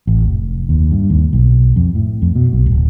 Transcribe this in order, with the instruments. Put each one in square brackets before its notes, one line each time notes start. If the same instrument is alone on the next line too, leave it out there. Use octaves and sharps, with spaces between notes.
[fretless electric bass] A1
F1
D#2
G2
D#2
B1
F2
A2
F2
B2
B1
D1